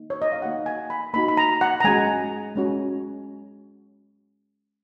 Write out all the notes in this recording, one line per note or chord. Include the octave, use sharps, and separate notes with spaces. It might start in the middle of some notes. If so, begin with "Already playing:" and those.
Already playing: A#3 D#4
C#5
D#5
F5
A#3 D#4 F#4 F#5
G#5
B5
A#3 D#4 F#4 B5
B5
A#5
F#5
A#5
G#3 C#4 F#4 G#5
G#3 C#4 F#4